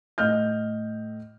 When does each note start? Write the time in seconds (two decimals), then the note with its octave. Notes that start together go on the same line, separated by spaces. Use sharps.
0.18 A2 D#5 F6 G6